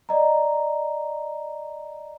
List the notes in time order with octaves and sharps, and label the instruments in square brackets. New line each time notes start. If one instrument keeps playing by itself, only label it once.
[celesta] D5 D#5 A#5